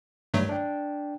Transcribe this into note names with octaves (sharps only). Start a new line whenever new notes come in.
G2 D#3 F#3 G3 A3
D4 G5